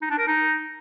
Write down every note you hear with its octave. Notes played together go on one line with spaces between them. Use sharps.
D#4
D4
A#4
D#4